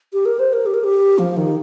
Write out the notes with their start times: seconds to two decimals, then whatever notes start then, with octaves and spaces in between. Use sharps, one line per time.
0.13 G4
0.26 A#4
0.39 C5
0.53 A#4
0.66 G4
0.74 A#4
0.84 G4
1.19 F3
1.37 D#3